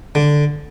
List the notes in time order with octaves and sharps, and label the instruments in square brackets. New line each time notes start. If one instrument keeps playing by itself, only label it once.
[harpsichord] D3